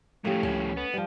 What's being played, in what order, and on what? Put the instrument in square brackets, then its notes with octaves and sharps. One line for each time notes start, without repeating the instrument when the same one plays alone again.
[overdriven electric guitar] F2 A2 [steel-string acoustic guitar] A3 C#4 [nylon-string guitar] F4 G4 A#4
[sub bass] C#2 [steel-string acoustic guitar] C#4
[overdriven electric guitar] B3
[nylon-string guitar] F3 G3